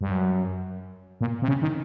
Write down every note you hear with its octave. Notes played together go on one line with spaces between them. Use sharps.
G2
F#2
A#2
C3
C#3
D#3